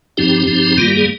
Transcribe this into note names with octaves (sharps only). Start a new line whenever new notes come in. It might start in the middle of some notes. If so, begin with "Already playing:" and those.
G2 F3 C4 D#4 G4
G2 F3 C4 D#4
G2 D#3 G3 A#3 F4
G4
G#4